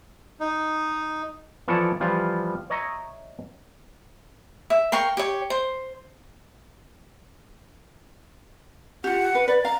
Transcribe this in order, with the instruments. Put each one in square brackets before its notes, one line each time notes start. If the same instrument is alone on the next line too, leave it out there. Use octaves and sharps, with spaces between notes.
[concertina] D#4
[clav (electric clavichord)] E3 F3 E4 A4 C#5 D5
E3 F3 G3 F4
C#5 D#5 E5 A#5
[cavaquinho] E5
A#4 F5 G5 C#6
G4 C#5
C5
[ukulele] F4 G4 [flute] F#5
[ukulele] B4
[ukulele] B4 [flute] D5
[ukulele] F5 [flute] A#5